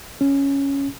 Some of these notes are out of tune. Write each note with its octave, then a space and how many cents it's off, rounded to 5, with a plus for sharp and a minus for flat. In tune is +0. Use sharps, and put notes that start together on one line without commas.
C#4 +0